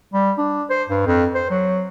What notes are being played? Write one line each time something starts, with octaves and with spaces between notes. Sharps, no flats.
G3
D4
C5
G2
F2
C5
F#3